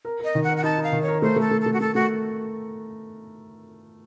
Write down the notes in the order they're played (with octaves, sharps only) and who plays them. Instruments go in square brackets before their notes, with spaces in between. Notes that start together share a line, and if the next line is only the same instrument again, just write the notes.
[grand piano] A#4
[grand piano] A#4 [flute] D#5
[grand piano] D#3
[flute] F#5
[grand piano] A#4
[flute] F#5
[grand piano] D#4 [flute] A5
[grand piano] D#4
[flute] F5
[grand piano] D#3
[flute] C#5
[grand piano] A#4
[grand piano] A3 [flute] C5
[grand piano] A3
[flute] A4
[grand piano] A3
[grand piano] A3 [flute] A4
[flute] F#4
[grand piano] A3 [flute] A4
[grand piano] A3 [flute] F#4